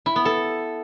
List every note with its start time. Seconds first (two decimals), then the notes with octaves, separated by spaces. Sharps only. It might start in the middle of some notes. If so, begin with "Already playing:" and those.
0.06 E4
0.16 B3
0.25 A4